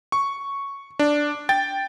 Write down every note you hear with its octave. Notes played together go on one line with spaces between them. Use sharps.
C#6
D4
G5 A6